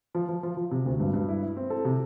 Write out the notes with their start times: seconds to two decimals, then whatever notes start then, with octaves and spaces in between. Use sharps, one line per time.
0.15 F3
0.29 F3
0.43 F3
0.57 F3
0.71 C3
0.86 D2
1.00 G2
1.14 G2
1.29 E4
1.43 E4
1.57 C4
1.70 A4
1.85 C3